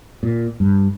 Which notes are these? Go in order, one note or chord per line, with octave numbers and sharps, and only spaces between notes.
A#2
G2